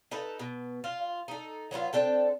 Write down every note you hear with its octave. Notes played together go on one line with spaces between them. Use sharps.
D#4 A4 B4
B2
F4
D#4 A4
F#3 B3 D#4 F4
C4 D4 A4 G5